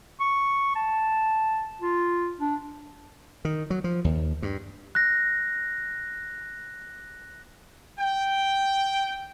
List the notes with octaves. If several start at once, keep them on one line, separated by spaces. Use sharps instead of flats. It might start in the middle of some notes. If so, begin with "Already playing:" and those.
C#6
A5
F4
D4
D#3
F#3
F3
D#2
G2
F#6 A#6
G5